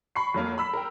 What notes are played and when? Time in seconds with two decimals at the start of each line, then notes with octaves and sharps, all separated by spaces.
0.16 B5 C#6 C7
0.34 F2 F#3 A#3
0.58 B5 E6 B6
0.73 A#4 G5